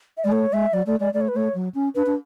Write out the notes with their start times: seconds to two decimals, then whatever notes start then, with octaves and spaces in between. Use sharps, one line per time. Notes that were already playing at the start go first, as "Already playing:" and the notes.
0.17 E5
0.24 G#3 D5
0.32 A3 C#5
0.52 G#3 E5
0.73 F#3 D5
0.86 A3 D5
1.00 G#3 D5
1.14 A3 D5
1.21 C#5
1.28 B4
1.34 A3 C#5
1.54 F#3
1.75 C#4
1.95 D4 B4
2.06 D4